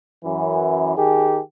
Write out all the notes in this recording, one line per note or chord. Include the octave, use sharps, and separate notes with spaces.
F#2 E3
D#3 G4 G#4